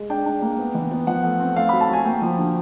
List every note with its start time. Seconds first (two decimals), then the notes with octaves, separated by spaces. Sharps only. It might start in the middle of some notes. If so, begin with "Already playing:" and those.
Already playing: G#3
0.10 D4 G5
0.26 D4
0.42 A#3
0.58 B3
0.74 E3
0.91 B3
1.07 F3 F#5
1.24 A3
1.40 C4
1.56 A3 F5
1.69 F#3 B5
1.81 A5
1.89 F#3 G#5
2.05 A#3 G5
2.22 F3
2.38 D3